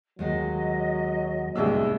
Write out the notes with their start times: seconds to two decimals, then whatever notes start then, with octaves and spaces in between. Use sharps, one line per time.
0.19 D#2 F#3 G#3 F#4 D#5
1.55 C2 A2 G#3 B3 D4 E6